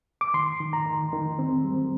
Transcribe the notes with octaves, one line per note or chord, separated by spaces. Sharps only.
D6
D#3 C6
D#3
A#5
D#3
D#3
C4
G3